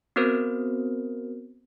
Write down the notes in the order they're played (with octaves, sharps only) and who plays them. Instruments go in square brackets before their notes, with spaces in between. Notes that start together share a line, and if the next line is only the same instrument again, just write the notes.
[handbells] B3 C4 F#4 A#4 C5